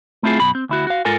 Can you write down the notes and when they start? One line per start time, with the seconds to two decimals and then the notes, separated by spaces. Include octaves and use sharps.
0.23 A3 C4 E4 F4 G#4
0.40 F#2 B2 B5
0.55 C4
0.69 D2 E4 F#4
0.87 F#4 F5
1.05 G#2 F4 A4 A#4 G#5